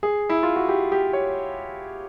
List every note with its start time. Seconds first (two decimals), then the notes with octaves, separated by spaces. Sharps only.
0.03 G#4
0.29 E4
0.43 F4
0.56 F#4
0.69 G4
0.92 G4
1.13 C#5